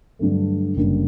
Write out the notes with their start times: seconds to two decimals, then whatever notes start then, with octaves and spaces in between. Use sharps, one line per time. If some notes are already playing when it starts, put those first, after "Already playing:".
0.19 G2 D3 F#3 A3
0.76 F#1 F#2 D3 G3 A#3